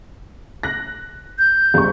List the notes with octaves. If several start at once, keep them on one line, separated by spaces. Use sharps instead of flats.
F#6 A#6
G6
F#1 G3 C#6